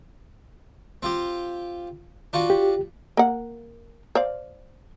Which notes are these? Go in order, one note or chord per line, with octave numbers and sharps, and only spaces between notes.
C4 F4 G4
D4 F4 F#4
G4
A#3 F#5
C5 D5 F5